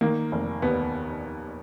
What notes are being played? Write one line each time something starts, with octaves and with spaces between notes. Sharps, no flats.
D#3 A#3
F1
D#2 B3